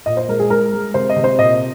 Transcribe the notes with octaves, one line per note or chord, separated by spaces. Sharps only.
A#2 D#5
C5
G#3 A#4
G#4
G#3 A#4
G#3
C3 C5
D#5
C3
C5
A#2 D#5